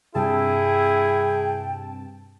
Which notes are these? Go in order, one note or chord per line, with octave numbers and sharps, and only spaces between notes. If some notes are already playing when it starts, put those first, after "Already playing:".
G2 C3 E4 G#4 G5 A5